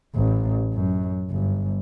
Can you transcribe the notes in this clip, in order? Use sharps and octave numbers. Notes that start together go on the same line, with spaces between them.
A1
F#2
G1